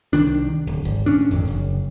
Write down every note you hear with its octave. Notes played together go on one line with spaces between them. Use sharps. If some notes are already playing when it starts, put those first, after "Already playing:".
C2 D#3 D4
D1
G#1
A2 C#4 D4
D1 G#1 F2
F#1